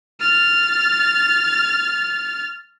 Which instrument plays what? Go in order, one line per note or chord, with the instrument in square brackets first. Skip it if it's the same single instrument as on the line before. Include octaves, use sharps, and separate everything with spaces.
[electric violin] F6 A6